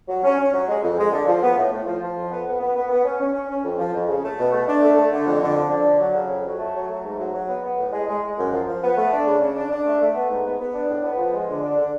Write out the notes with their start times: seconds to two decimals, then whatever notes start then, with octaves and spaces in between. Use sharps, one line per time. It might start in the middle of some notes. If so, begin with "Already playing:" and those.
0.09 F#3
0.24 C#4
0.38 C#4
0.53 F#3
0.67 G#3
0.82 F2
0.98 G#3
1.12 D3
1.27 F3
1.42 B3
1.57 A2
1.72 A2
1.86 F3
2.01 F3
2.16 F2
2.30 B3
2.46 B3
2.60 B3
2.75 B3
2.90 B3
3.04 C#4
3.20 C#4
3.34 C#4
3.49 C#4
3.64 F2
3.78 F3
3.93 F2
4.08 C#3
4.23 A3
4.38 B2
4.52 A3
4.67 D4
4.82 A3
4.97 A3
5.11 D3
5.26 F2
5.41 D3
5.56 F3
5.70 D4
5.85 D3
6.00 F#3
6.15 C#3
6.30 F2
6.45 F#3
6.59 A3
6.74 F#3
6.89 A3
7.04 G#2
7.18 F#3
7.33 F#3
7.48 B3
7.63 B3
7.78 A2
7.93 G#3
8.08 G#3
8.22 G#3
8.36 F#2
8.52 F3
8.67 F3
8.82 B3
8.96 A3
9.11 D4
9.26 C#3
9.41 C#3
9.56 D4
9.70 D4
9.85 A3
10.00 A3
10.14 B3
10.29 G#2
10.44 B3
10.59 B3
10.74 D4
10.89 A2
11.04 B3
11.18 F3
11.34 G#3
11.48 D3
11.62 D4
11.77 D3